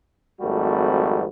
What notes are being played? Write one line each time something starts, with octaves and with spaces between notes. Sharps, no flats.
G#1 F2 G3 A3 F#4